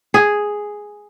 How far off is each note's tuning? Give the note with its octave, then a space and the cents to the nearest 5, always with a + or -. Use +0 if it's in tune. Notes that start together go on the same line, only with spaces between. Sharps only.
G#4 +0